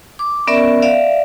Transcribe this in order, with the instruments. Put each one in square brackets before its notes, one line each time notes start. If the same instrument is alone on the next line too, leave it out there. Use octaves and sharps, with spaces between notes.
[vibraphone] D6
B3 C#4 A#4 D5 E5
D5 E5 F5